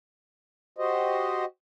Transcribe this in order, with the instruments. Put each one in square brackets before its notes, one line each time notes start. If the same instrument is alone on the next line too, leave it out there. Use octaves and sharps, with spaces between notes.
[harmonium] F#4 G4 C5 D#5